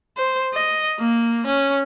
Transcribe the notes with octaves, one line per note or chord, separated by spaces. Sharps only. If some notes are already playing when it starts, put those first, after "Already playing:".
C5
D#5
A#3
C#4